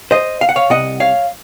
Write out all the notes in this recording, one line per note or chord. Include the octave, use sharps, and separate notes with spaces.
C5 D#5
F5
F#5
C#5 F5
C2 C3 D#5 F#5
C#5 F5